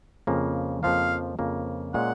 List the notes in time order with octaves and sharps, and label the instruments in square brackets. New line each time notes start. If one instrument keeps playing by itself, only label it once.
[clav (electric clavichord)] F2 C#3 F3 A#3
[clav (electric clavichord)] F2 C#3 F3 A#3 [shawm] F5
[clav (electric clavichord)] F2 C#3 F3 A#3
[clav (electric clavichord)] A#2 G#3 C#4 G#4 [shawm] F#5